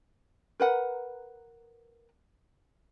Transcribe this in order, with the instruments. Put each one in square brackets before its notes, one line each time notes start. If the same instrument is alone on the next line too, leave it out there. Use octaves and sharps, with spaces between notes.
[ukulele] A#4 B4 F#5